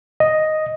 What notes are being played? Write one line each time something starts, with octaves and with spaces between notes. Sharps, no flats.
D#5